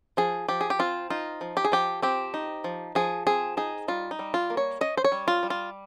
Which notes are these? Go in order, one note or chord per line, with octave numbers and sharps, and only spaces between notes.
F3 G#4
F3 G4
G#4
G4
C4 F4
D#4 F4
F3
G4
G#4
F3 G4
C4 G4
D#4
F3
F3 G#4
C4 G#4
D#4 G#4
G3 F4
D#4
G3
F4
A#3
C#5
C#4 D#5
C5
C#5
G3
F4
G3
F4